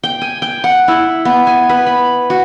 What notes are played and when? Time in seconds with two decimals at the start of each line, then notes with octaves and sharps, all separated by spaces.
0.03 G5
0.22 G#5
0.42 G5
0.64 F#5
0.88 E4
1.25 B3
1.47 G#5
1.69 B4
1.87 B5
2.30 F#4